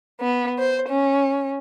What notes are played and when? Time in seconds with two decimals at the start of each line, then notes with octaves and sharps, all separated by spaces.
0.21 B3
0.59 C5
0.89 C#4